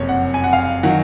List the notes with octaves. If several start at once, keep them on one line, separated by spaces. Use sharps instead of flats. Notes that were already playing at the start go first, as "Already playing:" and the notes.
Already playing: F#1 F2 C3 C#5
F#5
G#5
F#5
F5
D#3 F#3 F#5